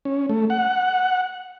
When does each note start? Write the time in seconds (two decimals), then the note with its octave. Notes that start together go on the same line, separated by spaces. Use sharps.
0.05 C#4
0.29 A3
0.50 F#5